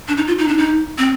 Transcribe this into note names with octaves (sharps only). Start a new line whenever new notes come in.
D4
D#4
F4
D#4
D4
D#4
C4